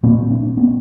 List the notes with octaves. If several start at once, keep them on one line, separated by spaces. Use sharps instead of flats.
A#2 A#3 C4
C4 D4
B3 C#4